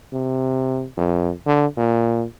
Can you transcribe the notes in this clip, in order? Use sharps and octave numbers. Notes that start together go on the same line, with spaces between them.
C3
F2
D3
A#2